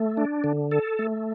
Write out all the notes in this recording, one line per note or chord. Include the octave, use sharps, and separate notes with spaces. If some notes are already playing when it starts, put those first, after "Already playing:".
Already playing: A3
D4
D3
A4
A3